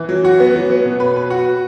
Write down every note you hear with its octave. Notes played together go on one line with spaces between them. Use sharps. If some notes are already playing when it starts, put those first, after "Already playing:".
Already playing: E3
F#3
F#4
B3
F#3
B3
B2
B4
B4
F#4